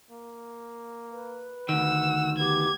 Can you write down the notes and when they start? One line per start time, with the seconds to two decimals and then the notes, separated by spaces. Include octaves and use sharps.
0.11 A#3
1.11 B4
1.69 D2 D#3 F#5 E6
2.38 B3 G4 G#6